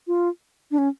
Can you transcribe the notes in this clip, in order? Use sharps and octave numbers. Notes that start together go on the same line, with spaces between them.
F4
D4
C#4